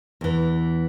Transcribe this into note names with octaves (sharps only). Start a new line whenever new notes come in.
E2 E3